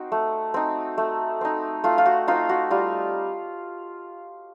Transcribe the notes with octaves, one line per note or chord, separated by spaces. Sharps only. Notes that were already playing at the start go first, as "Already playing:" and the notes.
Already playing: C4 D#4 F#4
A3
C4 D#4
A3
C4 D#4
A3 F4
F4
F#4
C4 D#4 F4
F#4
G3 F4